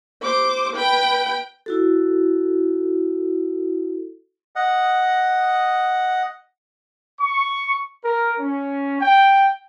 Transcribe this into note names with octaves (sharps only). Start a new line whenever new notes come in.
C5 D6
B4 G5
E4 F#4 A4
D#5 F#5
C#6
A#4
C#4
G5